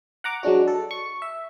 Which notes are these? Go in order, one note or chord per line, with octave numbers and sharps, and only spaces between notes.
F#5 A#5 D6
F#3 G#3 D4 F#4
A4
C#6
E5